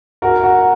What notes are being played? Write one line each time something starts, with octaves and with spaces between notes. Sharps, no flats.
F#4 A#4
F#4